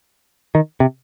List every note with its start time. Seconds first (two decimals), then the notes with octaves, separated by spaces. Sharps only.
0.55 D#3
0.80 C3